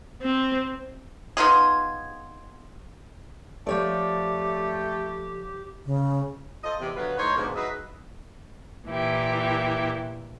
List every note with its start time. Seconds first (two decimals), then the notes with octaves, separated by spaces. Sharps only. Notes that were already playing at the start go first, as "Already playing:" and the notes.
0.21 C4
1.37 B3 D#4 F4 G#4
3.67 F3 A3 G4 C#5 D5
5.85 C#3
6.63 F4 A4 C5 D#5
6.80 E2 C3
6.96 D3 F#3 B3 F4 B4
7.17 A2 D#4 C5 C#5
7.36 G#2 B2 D3 F3 A#3 B3
7.55 F#3 D#4 G#4 B4 D#5 E5
8.88 A#2 E3 E4 G4